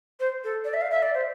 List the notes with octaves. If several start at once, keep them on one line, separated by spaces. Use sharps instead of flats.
C5
A4
D5
E5
F5
E5
D5
C5